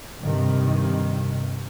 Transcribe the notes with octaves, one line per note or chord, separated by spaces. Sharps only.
G2 C3 D#3